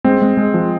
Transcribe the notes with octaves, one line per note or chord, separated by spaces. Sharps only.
G#3 C4
G#3
G#3
F3